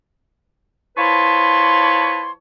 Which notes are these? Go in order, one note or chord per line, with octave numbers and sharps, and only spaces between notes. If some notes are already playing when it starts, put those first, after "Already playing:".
F3 E4 B4 C#5 A5 C6